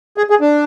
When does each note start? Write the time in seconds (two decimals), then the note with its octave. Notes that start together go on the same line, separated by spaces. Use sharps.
0.17 G#4
0.30 G#4
0.41 D4